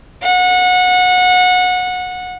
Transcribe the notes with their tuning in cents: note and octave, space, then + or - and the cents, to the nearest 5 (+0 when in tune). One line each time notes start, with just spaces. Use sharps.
F#5 -25